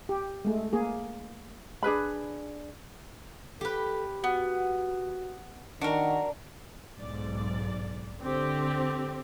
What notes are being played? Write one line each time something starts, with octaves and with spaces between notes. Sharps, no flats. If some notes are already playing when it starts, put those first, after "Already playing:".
G4
G#3 A3
A#3 G#4
D4 G#4 B4 B5
G4 A4 B4
B3 F#4
D#3 D4 F#4 A#4
B1 G#2 D5
D3 C4 G4